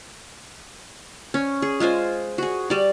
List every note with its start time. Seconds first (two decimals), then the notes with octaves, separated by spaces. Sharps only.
1.34 C#4
1.62 G#4
1.80 G#3 F4 C5 G#5
2.38 F#4 G#4
2.70 G3 D5